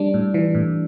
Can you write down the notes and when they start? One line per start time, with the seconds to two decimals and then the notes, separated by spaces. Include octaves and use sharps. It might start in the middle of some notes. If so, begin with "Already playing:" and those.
Already playing: G3 D4
0.14 A2
0.34 E3
0.55 A2